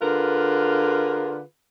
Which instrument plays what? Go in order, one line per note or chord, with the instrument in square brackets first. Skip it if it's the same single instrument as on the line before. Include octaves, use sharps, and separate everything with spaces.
[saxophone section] D3 F4 G#4 A#4 B4